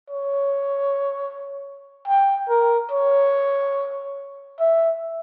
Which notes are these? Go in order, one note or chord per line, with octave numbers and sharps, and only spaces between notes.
C#5
G5
A#4
C#5
E5